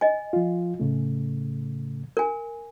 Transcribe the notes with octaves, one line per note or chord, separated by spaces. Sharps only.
D#5 G#5
F3 F4
A2 C#3 A3
A#4 G#5